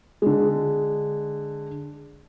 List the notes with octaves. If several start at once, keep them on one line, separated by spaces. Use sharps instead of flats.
D3 G#3